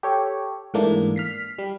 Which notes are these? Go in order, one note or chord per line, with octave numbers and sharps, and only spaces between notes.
G4 A4 C#5
G#2 E3 A3 A#3 D4
F6 B6 C7
G3